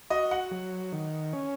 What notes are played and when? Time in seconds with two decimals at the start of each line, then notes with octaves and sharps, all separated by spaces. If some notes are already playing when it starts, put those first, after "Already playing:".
0.10 F#4 D#5
0.31 F#5
0.51 F#3
0.92 D#3
1.33 C#4